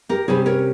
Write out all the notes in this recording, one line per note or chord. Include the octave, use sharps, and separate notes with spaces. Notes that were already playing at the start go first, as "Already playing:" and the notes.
G4 A#4
C3 G3 C#4 G#4 C5
A#4 C#5